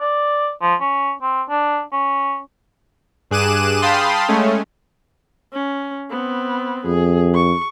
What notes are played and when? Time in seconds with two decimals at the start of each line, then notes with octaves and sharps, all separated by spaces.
0.01 D5
0.62 F3
0.81 C#4
1.22 C4
1.50 D4
1.92 C#4
3.31 G2 G#4 D6 F#6 D#7 E7
3.82 F5 G5 A5 B5 C6 D#6
4.28 G#3 A3 C#4
5.53 C#4
6.11 B3 C4
6.85 F2 G#4
7.35 C#6